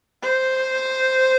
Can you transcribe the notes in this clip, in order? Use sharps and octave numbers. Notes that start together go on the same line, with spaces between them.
C5